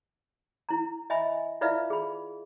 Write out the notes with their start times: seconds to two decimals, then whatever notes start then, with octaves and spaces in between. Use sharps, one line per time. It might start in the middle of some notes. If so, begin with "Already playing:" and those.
0.69 E4 A#5
1.10 D#5 E5 G#5 B5
1.61 E4 F4 B4 D5 E5 F5
1.90 G#4 B5